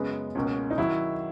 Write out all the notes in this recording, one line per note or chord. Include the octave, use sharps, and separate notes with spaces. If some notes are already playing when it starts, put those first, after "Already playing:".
Already playing: F#2 C#3 G#3 B3
C#2 B2 A#3 C#4
D#4
D#3 F#3 E4